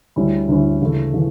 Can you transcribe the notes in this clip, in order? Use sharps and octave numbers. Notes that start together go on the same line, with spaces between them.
D2 D3 G3 C#4 E4
D2 D3 G3 C#4 E4
D2 C#3 E3 A3
C#3 E3